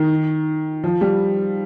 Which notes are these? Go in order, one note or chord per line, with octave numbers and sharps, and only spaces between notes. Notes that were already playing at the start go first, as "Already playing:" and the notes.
Already playing: D#3
F3
G3